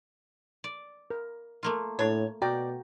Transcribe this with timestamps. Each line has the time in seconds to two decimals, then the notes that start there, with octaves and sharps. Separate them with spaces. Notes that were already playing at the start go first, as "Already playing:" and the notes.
0.64 D5
1.10 A#4
1.63 A3 A#3 F4
1.99 A2 D4 C#5
2.42 B2 F#4 D5 G5 A#5